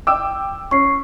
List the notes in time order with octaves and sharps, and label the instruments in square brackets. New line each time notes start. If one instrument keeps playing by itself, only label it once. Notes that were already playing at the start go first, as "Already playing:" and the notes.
[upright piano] G5 D6 E6
[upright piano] C#4 [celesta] C#6 C7